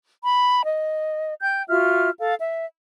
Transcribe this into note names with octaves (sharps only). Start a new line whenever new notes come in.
B5
D#5
G5 G6
F4 F#4 E5 F6
A4 F5
E5